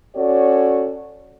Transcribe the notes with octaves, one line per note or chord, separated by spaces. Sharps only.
C#4 F#4 A4 C#5 D5